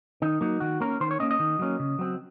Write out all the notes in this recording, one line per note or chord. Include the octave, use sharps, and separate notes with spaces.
D#3 D#4
F#3 A#3 D#4
D#3 F#4
A#3 C#4 A#4
D#3 C5
C#5
A#3 C#4 D#5
D#5
D#3
F#3 A#3 C#4
C#3
F#3 C4